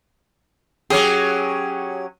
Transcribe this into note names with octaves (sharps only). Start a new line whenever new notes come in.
F#3 C#4 G4 G#4